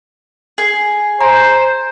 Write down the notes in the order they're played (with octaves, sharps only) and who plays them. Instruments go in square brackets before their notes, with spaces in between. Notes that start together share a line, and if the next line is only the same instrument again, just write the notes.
[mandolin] G#4
[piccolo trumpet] C5 [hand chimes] G#5 A#5